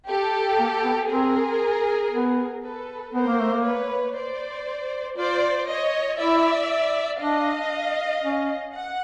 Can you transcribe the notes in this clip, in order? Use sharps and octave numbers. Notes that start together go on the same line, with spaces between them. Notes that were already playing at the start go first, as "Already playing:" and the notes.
G4 A4
A#3
B3
C4 G#4 A#4
B3
A4 B4
B3 A#4 C5
A#3
A3
A#3
B4 C#5
C5 D5
F4 C5 D5
C#5 D#5
E4 D5 E5
D4 D#5 F5
C#4
F#5